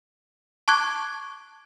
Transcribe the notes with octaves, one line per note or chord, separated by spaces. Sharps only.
A5 C#6 D6 F#6 G#6